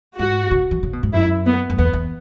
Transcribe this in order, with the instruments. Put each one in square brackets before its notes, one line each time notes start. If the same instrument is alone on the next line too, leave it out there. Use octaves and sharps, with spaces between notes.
[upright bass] G#2 [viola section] F#4
[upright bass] C#3
E3
C#3
B2
G#2
[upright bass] F#2 [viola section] E4
[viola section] B3
[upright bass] F#2
[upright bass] E2 [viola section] B3
[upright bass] E2